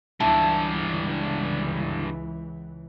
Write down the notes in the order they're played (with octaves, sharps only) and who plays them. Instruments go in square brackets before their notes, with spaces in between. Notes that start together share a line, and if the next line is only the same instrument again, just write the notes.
[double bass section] C#2 E3 [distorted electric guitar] G2 D3 [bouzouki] E4 A5